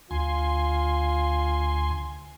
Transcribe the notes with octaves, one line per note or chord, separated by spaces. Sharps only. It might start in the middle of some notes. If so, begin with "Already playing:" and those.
D2 F4 G#5 C6